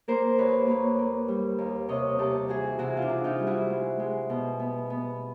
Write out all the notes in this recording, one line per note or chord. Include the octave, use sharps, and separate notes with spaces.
A#3 A#4 C5
D#2 B4 C#5
A#3 B4 C#5
A#3
G3
D#2
C3 C#5 D#5
C3 G4 A4
E3 F#4 G#4
C3 E4 F#4
F4
D4 E4
C3
D#4 F4
G3
E4 F#4
G#3
G#3
B2
B3
B3